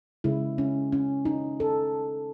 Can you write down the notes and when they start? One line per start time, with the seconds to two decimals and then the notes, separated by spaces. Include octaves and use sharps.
0.24 C#3 G#3 E4
0.58 C#4
0.92 C#4
1.25 D#4
1.60 A4